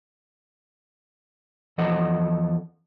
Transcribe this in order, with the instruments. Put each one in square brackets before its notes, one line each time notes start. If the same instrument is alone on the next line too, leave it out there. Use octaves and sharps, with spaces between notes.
[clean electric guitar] E2 F3 A4 D#5 F#5